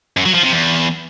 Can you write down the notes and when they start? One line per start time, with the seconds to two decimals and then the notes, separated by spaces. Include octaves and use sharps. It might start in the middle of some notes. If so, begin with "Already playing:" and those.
0.17 F#2
0.26 F#3
0.34 F3
0.43 C3
0.52 E2